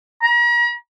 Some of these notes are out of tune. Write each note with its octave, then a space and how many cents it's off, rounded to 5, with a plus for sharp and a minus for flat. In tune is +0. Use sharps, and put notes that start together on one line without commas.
A#5 +40